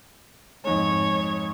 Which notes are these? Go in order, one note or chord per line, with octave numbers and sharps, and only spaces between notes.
F2 G#2 G#3 C#5